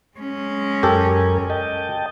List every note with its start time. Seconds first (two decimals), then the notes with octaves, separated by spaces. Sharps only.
0.17 G#3 C#4
0.83 F#2 G4 A4 A#4 G#5
1.50 D#5 G5 A5